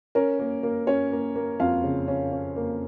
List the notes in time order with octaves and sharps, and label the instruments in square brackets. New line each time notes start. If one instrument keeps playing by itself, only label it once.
[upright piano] C#4 A#4
A#3
A#3
C#4 C#5
A#3
A#3
F2 F4 F5
C#3
C#4
C#4
A#3